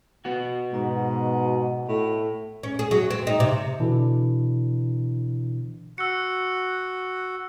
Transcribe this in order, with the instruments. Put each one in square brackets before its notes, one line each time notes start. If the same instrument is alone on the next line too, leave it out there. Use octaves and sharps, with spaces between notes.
[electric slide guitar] B3 F#4
[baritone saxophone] G#2 [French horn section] B2
[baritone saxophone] A2
[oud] C#4
G#4
F#3
C4
D#4
C3
[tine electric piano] B2 D3 E3 D4 E4
[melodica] F#4 [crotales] E6 C#7